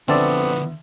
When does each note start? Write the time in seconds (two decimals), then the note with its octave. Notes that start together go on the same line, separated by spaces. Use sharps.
0.08 D2 D3 F3 B3 C4 A4 D5